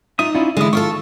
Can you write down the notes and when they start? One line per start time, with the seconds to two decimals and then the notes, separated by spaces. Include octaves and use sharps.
0.19 D#4 F4 E5 D#6
0.35 C#4 E4 F4 D5
0.57 D3 E3 G#3 E4 G#4 D#6
0.73 D#3 E4 F4 A4 C#6 E6